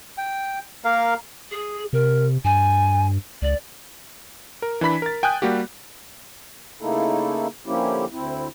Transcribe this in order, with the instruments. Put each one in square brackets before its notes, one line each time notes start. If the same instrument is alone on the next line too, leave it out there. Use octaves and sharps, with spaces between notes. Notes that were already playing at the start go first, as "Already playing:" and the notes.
[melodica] G5
A#3 A#4 F5
[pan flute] G#4
[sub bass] C3 [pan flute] A#4
[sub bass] G2 [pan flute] G#5
[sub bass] C#2 [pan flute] D5
[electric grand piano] A#4
E3 D4 B5 B6
A#4 A6
G5 G#5 D#6 F#6 G6
G3 A#3 F#4 G4
[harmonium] C#3 A3 A#3 D#4 E4 A4
D3 F3 A#3 C#4 E4 G4
D2 C4 E4